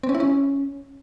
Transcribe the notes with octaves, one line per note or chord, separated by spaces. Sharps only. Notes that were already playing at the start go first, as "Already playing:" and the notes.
C4
C#4
E4
C#4